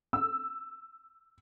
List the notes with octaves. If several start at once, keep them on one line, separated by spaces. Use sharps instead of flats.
E6